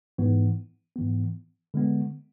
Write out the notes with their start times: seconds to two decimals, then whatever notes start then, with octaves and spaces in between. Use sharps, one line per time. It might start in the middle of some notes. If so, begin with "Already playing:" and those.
0.18 G#2 E3 B3
0.96 G#2 E3 B3
1.74 D3 G#3 B3